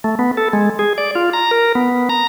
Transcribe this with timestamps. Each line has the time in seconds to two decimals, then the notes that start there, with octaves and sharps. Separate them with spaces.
0.04 A3
0.19 B3
0.37 A4
0.53 G#3
0.79 G#4
0.98 D5
1.15 F4
1.33 A#5
1.51 A#4
1.75 B3
2.09 A#5